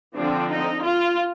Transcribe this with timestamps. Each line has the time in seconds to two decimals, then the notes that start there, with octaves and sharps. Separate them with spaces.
0.16 D3 F3 C4 D4
0.48 D#4
0.82 F4